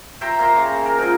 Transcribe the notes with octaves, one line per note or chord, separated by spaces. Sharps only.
C5 E5 G5 A#5
A#3 A#5 C6
C#3
A#4
G#2 F3 F4 D#5